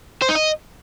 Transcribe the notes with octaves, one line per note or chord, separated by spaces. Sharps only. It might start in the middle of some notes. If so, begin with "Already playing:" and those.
C5
D#4
D#5